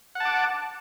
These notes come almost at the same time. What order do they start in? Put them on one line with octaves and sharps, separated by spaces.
F#5 A5 D6